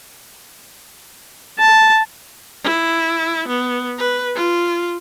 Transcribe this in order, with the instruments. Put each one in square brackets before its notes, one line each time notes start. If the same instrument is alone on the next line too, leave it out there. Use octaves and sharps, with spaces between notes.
[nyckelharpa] A5
[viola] E4
B3
B4
F4